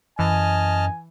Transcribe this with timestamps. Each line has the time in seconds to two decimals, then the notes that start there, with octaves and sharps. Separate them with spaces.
0.19 F#2 E3 D#5 G#5 A5 F6